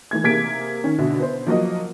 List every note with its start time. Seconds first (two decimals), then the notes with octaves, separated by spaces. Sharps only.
0.11 E3 A3 G#6
0.24 C3 A#3 G#4 G#6 B6 D7
0.84 D#3 C#4
0.98 B2 D3 E4
1.19 B3 C5
1.47 F3 F#3 A#3 F#4 A#4 D#5